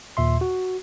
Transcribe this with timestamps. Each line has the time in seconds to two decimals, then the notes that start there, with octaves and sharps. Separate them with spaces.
0.17 D#2 A#2 E5 C6
0.41 F#4